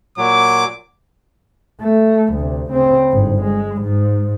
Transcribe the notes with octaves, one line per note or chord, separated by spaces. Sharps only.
A#2 F#3 D6
A3
D2 C3
C#3 C4
G1 G#2
G#3
G#2